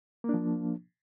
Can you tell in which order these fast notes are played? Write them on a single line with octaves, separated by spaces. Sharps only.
A#3 D4 F3